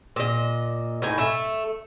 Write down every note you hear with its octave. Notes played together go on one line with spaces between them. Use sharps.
A#2 D#5
A2 D#4 G#5
A3 E5